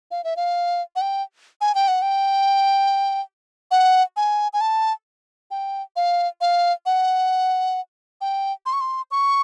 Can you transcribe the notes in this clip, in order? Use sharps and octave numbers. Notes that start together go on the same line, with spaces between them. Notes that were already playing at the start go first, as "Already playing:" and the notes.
F5
E5
F5
F#5
G5
G#5
G5
F#5
G5
F#5
G#5
G#5
A5
G5
F5
F5
F#5
G5
C6
C#6
C6
C#6